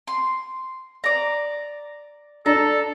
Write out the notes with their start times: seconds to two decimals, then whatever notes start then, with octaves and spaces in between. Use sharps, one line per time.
0.07 C6
1.04 D5 A#5
2.46 D4 A4 A#5